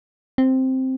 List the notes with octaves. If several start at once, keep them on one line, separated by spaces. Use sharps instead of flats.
C4